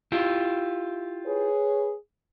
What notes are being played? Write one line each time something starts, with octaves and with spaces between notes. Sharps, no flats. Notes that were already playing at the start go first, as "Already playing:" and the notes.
E4 F4 G4
G#4 B4 C#5